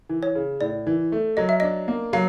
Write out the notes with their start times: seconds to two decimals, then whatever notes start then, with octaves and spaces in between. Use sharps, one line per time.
0.09 E3
0.23 C#5
0.35 C#3
0.61 A2 D5
0.87 E3
1.12 A3
1.37 F#3 D#5
1.49 E5
1.60 D4 D#5
1.88 A#3
2.13 F#3 F5